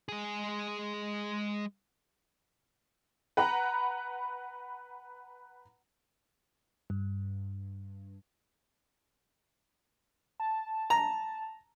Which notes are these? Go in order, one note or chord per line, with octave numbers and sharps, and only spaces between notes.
G#3 G#4
B4 F#5 A#5 B5
G2
A5
A#5